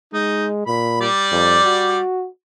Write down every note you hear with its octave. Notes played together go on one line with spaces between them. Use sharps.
G#3 D#4
A#2 B5
G3 D5
F2
F#4